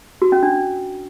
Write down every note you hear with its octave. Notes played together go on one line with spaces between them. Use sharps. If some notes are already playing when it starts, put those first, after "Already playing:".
F#4
C#4
D4